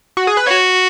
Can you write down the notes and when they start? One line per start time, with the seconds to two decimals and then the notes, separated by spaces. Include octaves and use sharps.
0.17 F#4
0.27 G#4
0.37 B4
0.46 F#4 C#5